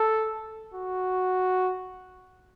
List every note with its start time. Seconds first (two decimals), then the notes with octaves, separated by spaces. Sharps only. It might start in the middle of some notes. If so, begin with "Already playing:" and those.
Already playing: A4
0.74 F#4